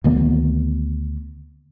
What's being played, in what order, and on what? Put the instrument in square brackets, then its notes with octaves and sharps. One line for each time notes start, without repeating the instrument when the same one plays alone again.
[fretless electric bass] D2 D#3 A#3 B3